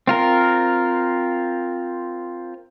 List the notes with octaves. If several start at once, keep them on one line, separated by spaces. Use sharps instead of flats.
C4 F4 A#4